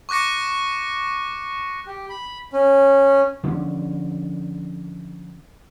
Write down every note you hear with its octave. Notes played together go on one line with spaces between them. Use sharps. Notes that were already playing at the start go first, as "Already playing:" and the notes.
C#6 D6 F#6 A#6 C#7
G4
B5
C#4
D3 F3 A#3 C#4